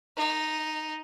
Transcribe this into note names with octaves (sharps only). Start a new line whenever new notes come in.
D#4